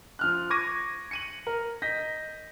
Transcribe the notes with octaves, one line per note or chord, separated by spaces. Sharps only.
F3 F6 F#6
C#6 D6 G#6 A#6 D#7
C#7 D#7 F#7
A#4
D#5 G6 A#6 B6